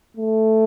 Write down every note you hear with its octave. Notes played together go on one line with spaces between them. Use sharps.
A3